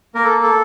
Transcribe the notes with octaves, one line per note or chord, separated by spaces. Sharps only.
A#3 A#4
A4
A4